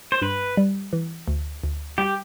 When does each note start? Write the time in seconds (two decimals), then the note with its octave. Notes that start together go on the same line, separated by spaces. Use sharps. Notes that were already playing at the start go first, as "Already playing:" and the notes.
0.12 C5
0.22 G2 B4
0.57 G3
0.93 E3
1.28 D2
1.64 D2
1.98 G3 G4